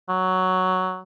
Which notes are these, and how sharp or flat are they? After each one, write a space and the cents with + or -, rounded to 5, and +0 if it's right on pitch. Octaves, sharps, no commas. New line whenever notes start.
F#3 +5